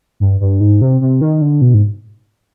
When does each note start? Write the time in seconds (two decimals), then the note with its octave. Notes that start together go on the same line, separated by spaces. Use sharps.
0.20 G2
0.40 G2
0.60 G#2
0.82 C3
1.01 C3
1.21 D#3
1.42 D3
1.61 B2
1.74 G#2